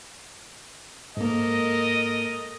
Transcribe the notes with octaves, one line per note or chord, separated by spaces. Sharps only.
G#2 A#3 A4 A#4 D#5